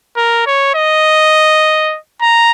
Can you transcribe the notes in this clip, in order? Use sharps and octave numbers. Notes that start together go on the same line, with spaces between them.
A#4
C#5
D#5
A#5